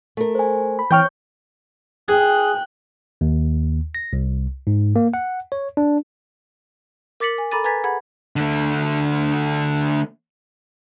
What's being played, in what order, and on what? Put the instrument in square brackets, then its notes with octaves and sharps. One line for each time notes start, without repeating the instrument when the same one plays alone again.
[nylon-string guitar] A3 A#4
[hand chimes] C5 G#5
[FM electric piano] B5
[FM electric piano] E3 G5 F6 [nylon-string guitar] C4 [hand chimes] C#5 C#6 G6
[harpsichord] G#4 [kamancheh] G5 F#6
[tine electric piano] D#2
A#6
C2
G#2
A#3
F#5
C#5
D4
[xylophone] A#4 D6 A6 B6 C#7 F#7
G#5
A4 A#5 B5 D6 A6 D#7
B4 G#5 A#5 G#6 A6 B6
G#4 F#5 B5 G#6
[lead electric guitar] D3 A3